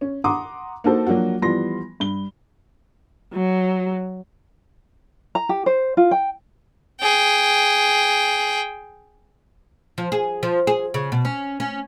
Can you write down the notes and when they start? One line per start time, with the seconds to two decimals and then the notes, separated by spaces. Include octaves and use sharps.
0.01 C#4
0.24 F#5 A#5 C6 D6 D#6
0.84 A#3 D#4 F#4 A4 C5
1.07 F3 F#3 A#3 D4 F#4
1.42 E3 F3 G3 B3 C6 A#6
2.00 G2 G7
3.34 F#3
5.35 A#5
5.49 G4
5.66 C5
5.97 F4
6.11 G5
7.01 G#4 G5
9.98 F3
10.12 G#4
10.43 F3
10.67 G#4
10.94 C#3
11.12 B2
11.25 C#4
11.60 C#4